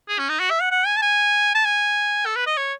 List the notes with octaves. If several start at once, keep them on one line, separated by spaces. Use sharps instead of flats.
G#4
C#4
D#4
F#4
E5
F#5
F#5
G#5
A5
G#5
A5
G#5
A4
B4
D#5
C#5